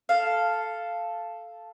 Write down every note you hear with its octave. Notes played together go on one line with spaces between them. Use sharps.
A4 F5